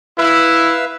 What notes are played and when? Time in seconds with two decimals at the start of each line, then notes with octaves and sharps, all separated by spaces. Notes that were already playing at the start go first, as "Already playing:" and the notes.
0.18 E4 B4 E5 F5